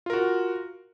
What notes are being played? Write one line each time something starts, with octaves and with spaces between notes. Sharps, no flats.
F4 F#4 A#4